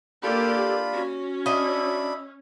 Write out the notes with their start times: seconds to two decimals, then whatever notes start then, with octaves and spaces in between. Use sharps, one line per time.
0.23 A#3 D4 F4 G4 A4 D5 B5
0.94 C#4 F#4
1.46 D4 D#5 E5 B5